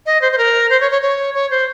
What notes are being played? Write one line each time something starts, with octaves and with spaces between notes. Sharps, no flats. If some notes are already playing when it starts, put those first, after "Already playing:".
D#5
C5
C5
A#4
C5
C#5
C#5
C#5
C#5
C5